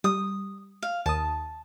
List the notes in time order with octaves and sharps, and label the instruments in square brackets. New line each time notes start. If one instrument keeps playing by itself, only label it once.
[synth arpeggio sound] G3 [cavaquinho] D#6
[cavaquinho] F5
[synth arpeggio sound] D#2 D#6 [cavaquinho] A5